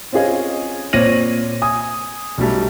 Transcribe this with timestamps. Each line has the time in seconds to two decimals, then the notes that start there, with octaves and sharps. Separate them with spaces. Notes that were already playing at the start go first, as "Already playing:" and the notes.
0.12 C4 C#4 F4 G#4 D#5
0.93 A#2 C4 C#5 A#6 D#7 F#7
1.62 G#5 D#6
2.38 B1 F#3 G3 A3